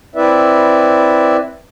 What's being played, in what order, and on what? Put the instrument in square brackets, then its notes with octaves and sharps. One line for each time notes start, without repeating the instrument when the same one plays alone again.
[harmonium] C4 E4 B4 D5 E5